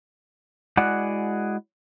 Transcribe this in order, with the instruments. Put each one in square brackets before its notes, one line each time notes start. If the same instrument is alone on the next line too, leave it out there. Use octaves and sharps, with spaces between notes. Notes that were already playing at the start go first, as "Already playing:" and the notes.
[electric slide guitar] G#3 E4 F#4 G#4 D5 F#5